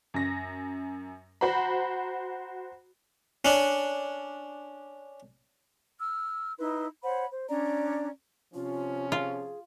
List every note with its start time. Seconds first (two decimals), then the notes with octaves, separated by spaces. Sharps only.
0.14 F#2 A#6
1.41 F#4 C5 A#5 B5
3.45 C#4 D4
6.00 E6 F6
6.58 D#4 E4 B4 C6
7.03 C5 C#5 F#5 B5
7.31 C5
7.49 C#4 D4 D5 A#5
8.54 C3 F3 C#4 F4
9.12 F4 G#4